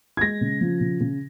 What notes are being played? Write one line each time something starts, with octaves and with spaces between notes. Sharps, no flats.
G#6
G#3 A#6
C#3
F3
C#3
C#3